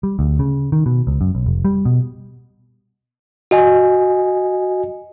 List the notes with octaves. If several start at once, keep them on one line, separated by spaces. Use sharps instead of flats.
G3
D2
C#3
D#3
B2
C#2
F#2
B1
F1
G3
B2
F#4 D#5 G#5